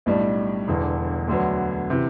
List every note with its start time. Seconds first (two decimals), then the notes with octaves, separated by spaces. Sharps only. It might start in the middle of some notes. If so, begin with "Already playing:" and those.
0.06 B1 A2 G3 D4
0.68 E1 E2 D3
1.28 D2 D3 F#3 B3
1.90 C3 E3